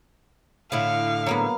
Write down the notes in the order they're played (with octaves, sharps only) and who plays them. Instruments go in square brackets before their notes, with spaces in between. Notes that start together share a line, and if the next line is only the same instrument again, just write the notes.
[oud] A2 D3 E4 [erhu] F5
[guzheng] F#3 A#3 B3